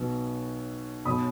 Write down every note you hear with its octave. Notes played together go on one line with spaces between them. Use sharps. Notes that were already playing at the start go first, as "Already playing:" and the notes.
Already playing: B1 B2 F#3 B3
B1 B2 F#3 B5 D#6